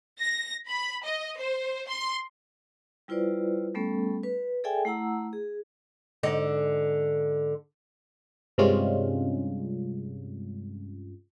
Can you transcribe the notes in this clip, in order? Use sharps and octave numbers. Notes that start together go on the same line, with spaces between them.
A#6
B5
D#5
C5
C6
G3 E4 F4 B4 C5 D5
G3 A3 B3 C#4 A4
B4
G#4 A4 D5 E5 G5 G#5
A3 E4 F#5 A#5 E6
G#4
G#2 D3 D#5
G2 C3 G3 G#3 C#4 F4